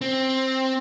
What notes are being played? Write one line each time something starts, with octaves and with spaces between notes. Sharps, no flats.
C4